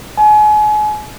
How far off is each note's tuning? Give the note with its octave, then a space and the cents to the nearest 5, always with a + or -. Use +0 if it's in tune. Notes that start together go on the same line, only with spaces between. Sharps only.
G#5 +35